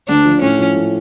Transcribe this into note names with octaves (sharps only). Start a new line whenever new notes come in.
D2 D4
F3
A2 C#4
F3
A2